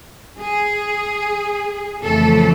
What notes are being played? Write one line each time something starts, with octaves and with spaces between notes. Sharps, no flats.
G#4
F2 C#3 E3 A3 A4